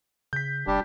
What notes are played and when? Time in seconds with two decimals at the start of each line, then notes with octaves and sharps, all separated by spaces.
0.33 C#3 G6 B6
0.67 F1 G3 D4 G4